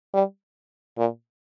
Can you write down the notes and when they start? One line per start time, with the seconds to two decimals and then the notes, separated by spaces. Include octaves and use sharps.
0.14 G3
0.98 A#2